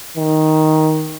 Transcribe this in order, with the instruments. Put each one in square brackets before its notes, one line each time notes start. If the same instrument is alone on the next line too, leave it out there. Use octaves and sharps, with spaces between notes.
[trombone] D#3